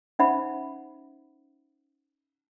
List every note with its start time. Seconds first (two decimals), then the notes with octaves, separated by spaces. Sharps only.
0.19 C#4 D#4 C5 E5 F#5 B5